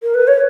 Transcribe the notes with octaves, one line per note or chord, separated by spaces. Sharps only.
A#4
B4
C#5